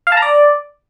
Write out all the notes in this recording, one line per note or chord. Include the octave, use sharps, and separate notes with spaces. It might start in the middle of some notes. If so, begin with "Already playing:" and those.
F5
A5
A#5
D5